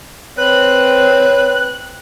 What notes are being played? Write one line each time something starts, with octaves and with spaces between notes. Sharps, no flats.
C4 B4 C#5 F#6